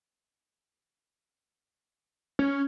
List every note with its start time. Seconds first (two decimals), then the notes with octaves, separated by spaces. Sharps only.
2.39 C#4